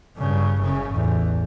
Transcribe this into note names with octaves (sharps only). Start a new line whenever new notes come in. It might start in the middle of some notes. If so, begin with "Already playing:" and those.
G2 C#3
F#1 C#3
A1 E2